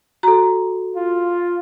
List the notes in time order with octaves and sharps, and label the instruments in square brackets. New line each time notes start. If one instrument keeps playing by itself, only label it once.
[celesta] F#4 A4 [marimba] A#5
[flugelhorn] F4